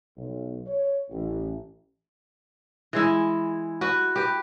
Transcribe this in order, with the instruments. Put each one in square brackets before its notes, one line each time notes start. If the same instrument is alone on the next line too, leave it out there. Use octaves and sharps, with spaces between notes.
[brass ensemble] B1
C#5
A1
[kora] E3 G#3 E4
F#4 B4
G4 B4